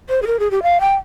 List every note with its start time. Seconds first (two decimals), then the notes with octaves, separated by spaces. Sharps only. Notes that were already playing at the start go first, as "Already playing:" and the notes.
0.10 C5
0.22 G#4
0.27 A#4
0.40 G#4
0.51 G4
0.63 F5
0.81 G5